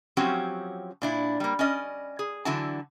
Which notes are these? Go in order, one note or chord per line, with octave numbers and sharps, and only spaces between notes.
F3 F#3 C4 C#4 F#4 G4
A#2 D4 E4
G3 A#3
C#4 D5 D#5
G#4
D3 E3 F#3 E4 F#4 A5